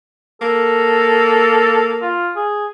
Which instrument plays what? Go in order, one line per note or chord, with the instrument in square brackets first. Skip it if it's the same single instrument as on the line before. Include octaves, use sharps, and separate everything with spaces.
[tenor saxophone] A#3 [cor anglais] A4
[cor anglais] F4
G#4